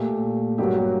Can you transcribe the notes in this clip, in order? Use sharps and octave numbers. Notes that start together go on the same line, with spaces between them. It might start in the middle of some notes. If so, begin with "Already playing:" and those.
Already playing: A#2 A3 G4
G2 F#3 A#3 G4
F#4
G4